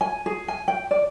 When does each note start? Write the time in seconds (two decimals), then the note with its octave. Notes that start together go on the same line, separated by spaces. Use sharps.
0.01 G#5
0.26 G#4
0.48 G#5
0.68 G5
0.91 D5